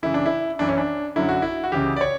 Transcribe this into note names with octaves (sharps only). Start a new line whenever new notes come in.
F#2 C#3 E3 E4
D4
E4
F#2 E3 D4
C#4
D4
F#2 D3 F#3 E4
F#4
E4
F#4
C#2 C#3 E3 G4
D5
C#5